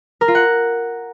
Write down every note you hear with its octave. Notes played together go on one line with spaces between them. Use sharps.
A#4
F4
F#5